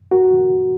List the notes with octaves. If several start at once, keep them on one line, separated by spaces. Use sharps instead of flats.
F#4 A#4